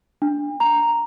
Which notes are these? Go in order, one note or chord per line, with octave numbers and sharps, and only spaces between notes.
D4
A#5